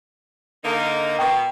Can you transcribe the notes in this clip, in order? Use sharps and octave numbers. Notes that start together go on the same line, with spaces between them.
D3 A#3 D#4 A#4
B2 G5 C#6